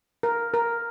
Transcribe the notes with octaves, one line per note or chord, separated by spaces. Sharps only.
A#4
A#4